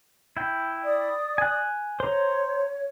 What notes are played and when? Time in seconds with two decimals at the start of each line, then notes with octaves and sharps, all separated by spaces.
0.37 E4 G5
0.83 D5 D#6
1.38 G#5 F#6
2.00 C5 C#5 A#5